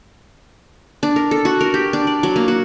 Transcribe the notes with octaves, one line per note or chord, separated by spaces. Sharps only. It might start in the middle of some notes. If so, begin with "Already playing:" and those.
D4
A#4
A4
F#4
A#4
G4
D4
D5
F#3
A#3
F#4